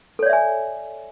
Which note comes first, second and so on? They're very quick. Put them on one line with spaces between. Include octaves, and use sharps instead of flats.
A4 C#5 D5 E5 G#5